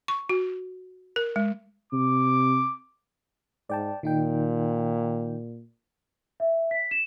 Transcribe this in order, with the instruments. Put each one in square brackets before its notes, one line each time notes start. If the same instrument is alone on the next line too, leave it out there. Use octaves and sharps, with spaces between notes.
[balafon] C#6
F#4
A#4
G#3
[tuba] C3 [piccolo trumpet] D6
[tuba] G#2 [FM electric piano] D5 G5 A5
[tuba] A#2 [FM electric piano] D#3 D#4 G5
[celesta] E5
B6
E7